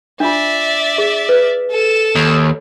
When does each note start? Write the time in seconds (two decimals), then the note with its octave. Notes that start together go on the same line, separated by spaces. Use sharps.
0.20 D4 F4 D5 E5
0.98 G#4
1.29 B4
1.70 A4 E7
2.15 D#2